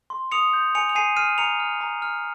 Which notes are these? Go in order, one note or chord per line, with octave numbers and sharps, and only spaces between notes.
C6
D#6 C#7 F7
G6
G#5 C#7 F7
F7
G#5 C7 D#7
F6 C7 D#7
A#5 C#7 F7
F6
A#5
F6